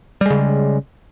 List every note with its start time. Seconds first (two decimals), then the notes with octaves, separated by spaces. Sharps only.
0.21 G3
0.26 G#3
0.30 C#3